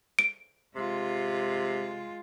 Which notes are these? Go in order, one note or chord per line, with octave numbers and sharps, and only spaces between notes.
D7
C3 G#3 F4